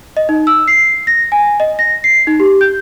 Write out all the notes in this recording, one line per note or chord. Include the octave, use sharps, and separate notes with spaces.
D#5
D#4
E6
C7
A#6
G#5
D#5
A#6
C7
D#4
G4
G6